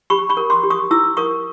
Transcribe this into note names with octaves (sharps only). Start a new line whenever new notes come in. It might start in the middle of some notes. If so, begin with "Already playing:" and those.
G4 B5 C#6
B5 C#6
A#4
C6 D6
G4
C#6 D#6
E4 D6 E6
A#4 C#6 D#6